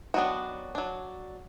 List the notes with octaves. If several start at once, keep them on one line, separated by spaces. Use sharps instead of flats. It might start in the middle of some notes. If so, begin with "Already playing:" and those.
D#3 F#3 B3 D4 F#4
F#3 D4